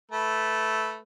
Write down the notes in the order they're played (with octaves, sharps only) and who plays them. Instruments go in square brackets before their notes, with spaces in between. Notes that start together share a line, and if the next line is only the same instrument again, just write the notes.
[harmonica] A3 B4